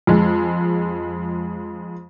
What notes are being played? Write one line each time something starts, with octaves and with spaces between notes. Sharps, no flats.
F2 G#3